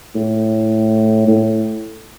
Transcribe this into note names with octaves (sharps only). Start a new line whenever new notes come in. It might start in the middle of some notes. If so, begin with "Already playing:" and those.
A2
A2